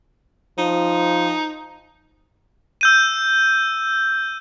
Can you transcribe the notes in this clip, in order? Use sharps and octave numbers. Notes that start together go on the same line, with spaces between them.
F3 D#4
E6 G6 D#7